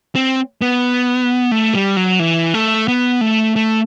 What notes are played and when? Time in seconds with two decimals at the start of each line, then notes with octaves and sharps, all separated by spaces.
0.15 C4
0.61 B3
1.51 A3
1.75 G3
1.96 F#3
2.20 E3
2.54 A3
2.88 B3
3.21 A3
3.56 A3